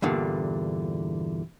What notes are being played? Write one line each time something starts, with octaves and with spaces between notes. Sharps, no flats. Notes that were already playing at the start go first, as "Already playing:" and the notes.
E2 G2 A#2 D3